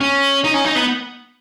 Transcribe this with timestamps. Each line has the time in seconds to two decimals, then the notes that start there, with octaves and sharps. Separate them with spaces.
0.01 C#4
0.44 D#4
0.54 C#4
0.65 D#4
0.76 B3